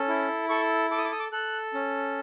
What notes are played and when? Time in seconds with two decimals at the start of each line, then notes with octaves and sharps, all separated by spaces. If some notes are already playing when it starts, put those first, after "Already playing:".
Already playing: C#4 A4
0.08 E4
0.49 A4 C#6
0.91 A4 D6
0.98 D#6
1.05 D6
1.12 D#6
1.19 D6
1.32 A4 F#6
1.74 C#4